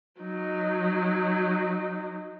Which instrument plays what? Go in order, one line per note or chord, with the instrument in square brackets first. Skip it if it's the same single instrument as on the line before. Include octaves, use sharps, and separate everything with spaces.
[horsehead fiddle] F#3 D#4